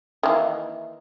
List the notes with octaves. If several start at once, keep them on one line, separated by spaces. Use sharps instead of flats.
D#3 E3 A#3